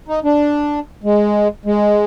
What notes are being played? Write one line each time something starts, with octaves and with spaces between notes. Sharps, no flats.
D#4
D4
G#3
G#3